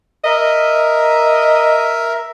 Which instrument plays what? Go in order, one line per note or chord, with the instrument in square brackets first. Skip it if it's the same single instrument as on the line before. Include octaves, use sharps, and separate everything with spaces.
[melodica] A#4 E5 [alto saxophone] D#5